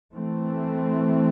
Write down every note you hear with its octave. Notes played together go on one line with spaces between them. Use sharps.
E3 A3 C4